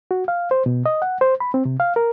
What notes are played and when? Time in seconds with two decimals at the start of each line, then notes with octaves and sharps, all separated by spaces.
0.11 F#4
0.28 F5
0.51 C5
0.66 B2
0.86 D#5
1.02 F#5
1.21 C5
1.40 B5
1.54 C4
1.65 C3
1.80 F5
1.96 A#4